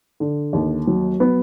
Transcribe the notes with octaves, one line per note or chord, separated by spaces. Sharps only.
D3
D#2
F#3
B3